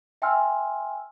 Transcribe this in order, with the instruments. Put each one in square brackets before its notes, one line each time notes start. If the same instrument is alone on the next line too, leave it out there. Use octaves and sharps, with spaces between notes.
[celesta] E5 G5 G#5 C6 E6 F6